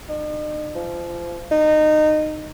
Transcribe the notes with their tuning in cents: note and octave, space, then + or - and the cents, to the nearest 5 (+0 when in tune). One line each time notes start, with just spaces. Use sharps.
D#4 -45
F3 -25
D#4 -20